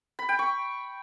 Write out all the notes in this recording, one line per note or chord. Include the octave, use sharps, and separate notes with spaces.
B5
G5
C#6